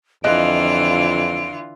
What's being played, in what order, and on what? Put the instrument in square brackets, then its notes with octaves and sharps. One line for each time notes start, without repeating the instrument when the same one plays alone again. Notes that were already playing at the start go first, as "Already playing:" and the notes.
[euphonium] F2 [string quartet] D3 E3 F4 [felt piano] D#5 F#6 [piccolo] D7